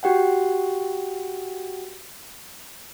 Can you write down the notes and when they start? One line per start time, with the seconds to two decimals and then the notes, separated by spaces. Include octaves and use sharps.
0.03 F#4 G4 F#5 G5